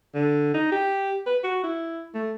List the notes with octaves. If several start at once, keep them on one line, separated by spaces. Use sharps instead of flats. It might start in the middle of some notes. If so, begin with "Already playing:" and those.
D3
D#4
G4
B4
F#4
E4
A3